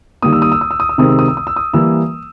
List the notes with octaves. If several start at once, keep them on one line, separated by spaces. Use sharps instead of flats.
D#3 G3 A#3 D#6
E6
D#6
E6
D#6
E6
D#6
E6
C3 D#3 G#3 C4 D#6
E6
D#6
E6
D#6
E6
D#6
E3 G3 A#3 E6